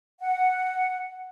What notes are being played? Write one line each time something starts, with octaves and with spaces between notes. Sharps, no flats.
F#5